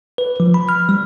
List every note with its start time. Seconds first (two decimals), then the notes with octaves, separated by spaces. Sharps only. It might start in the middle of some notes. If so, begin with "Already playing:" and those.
0.18 B4
0.40 F3
0.54 B5
0.69 F6
0.89 G3